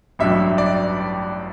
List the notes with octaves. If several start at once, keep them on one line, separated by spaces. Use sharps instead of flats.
A1 G2 F#3 E5
D5